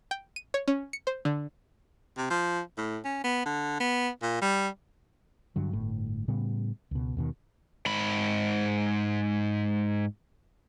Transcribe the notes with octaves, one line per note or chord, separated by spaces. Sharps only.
G5
D#7
C#5
C#4
C#7
C5
D3
C3
F3
A2
C#4
B3
D3
B3
A#2
G3
G2 D3 F#3
G1 A2
A2 C#3 G3 B3
C#2 B2
D#2 B2 D#3
G#2 B5